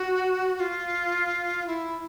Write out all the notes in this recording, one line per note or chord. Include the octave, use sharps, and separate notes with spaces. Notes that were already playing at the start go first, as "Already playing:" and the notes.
Already playing: F#4
F#4
F4
E4